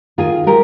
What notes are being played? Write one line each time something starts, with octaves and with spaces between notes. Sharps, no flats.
D#3 F4 G#4
G#3 G4 A#4